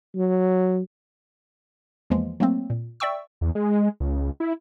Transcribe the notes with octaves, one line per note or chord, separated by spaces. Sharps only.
F#3
E2 E3 F3 G#3 A#3
F#3 A3 A#3 C4
A#2
D5 E5 G5 C#6 E6
E2
G#3
C#2
E4